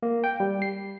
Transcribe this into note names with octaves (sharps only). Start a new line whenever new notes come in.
A#3
G5
G3
C7